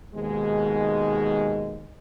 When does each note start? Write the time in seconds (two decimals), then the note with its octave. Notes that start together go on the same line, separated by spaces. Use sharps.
0.14 D#2 G#2 B2 G#3